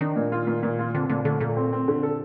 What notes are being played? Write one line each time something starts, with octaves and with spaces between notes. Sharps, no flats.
D#3 D4
A#2
F4
A#2
A#2
F4
D3 C4
A#2 D3
D3 A3
A#2 A3
C4
C4
D3
A4